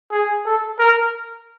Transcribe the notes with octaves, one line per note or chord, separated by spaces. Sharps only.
G#4
A4
A#4